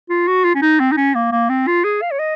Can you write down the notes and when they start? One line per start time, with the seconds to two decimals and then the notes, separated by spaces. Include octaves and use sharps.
0.09 F4
0.28 F#4
0.44 F4
0.55 C#4
0.62 D#4
0.80 C4
0.92 D#4
0.97 C#4
1.15 A#3
1.32 A#3
1.49 C4
1.67 F4
1.84 G#4
2.02 F5
2.11 C#5
2.19 D#5